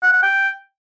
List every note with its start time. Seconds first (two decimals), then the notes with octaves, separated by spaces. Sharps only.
0.03 F#5
0.13 F#5
0.23 G5